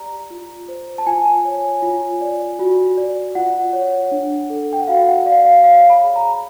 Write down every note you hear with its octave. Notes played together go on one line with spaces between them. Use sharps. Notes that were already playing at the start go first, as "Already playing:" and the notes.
Already playing: G4 D5 A#5
F4
C5
A5
F4 G#5
C#5
F4
D5
F#4
D5
F4 F#5
C#5
D4
A4
G5
F#5
F#4 F5
F#5
D5 F5
F5
C#5 F5
B5
G#4
A#5